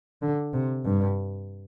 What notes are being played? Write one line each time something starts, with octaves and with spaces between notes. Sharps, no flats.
D3
C3
G2